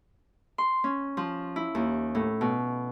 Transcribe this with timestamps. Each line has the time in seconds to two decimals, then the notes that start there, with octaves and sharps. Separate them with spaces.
0.58 C6
0.84 C#4
1.17 F3
1.56 E4
1.75 D#2
2.15 A2
2.41 B2